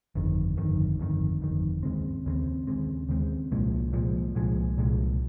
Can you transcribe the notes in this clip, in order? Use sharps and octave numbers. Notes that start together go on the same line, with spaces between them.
G1 F2 D#3
G1 F2 D#3
G1 F2 D#3
G1 F2 D#3
D#2 C#3 G#3 C4
D#2 C#3 G#3 C4
D#2 C#3 G#3 C4
D#2 C#3 G#3 C4
C2 A#2 F3 G#3
C2 A#2 F3 G#3
C2 A#2 F3 G#3
C2 A#2 F3 G#3